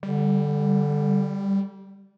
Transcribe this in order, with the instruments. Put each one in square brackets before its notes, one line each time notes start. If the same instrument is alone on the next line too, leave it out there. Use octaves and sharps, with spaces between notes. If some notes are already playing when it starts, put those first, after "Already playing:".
[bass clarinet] D3 [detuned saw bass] G3